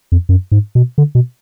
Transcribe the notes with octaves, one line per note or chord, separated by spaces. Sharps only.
F2
F#2
G#2
B2
D3
B2